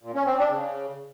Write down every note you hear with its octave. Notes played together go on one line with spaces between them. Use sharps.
A#2
C#4
C4
D4
C#3